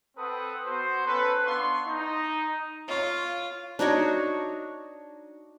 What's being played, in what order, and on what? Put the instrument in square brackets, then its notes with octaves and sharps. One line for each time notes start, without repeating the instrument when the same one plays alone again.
[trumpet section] C4 A4 B4 F#5 D#6
B3 F#4 C5
C#4 A4 B4
B3 D4 F4 C6 C#6
D#4
[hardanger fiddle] F4 [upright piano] C#5 F5 C#6
[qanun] D4 D#4 F#4 C#5